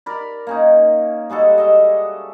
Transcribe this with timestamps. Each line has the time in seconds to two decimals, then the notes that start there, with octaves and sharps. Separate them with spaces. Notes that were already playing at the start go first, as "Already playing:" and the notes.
0.06 A#4 D5 B5
0.47 A#3 C#4 D#4
1.29 G3 G#3 F#4 A4
1.58 D#5 E5